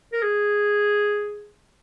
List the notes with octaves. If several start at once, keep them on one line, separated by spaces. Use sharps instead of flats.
A#4
G#4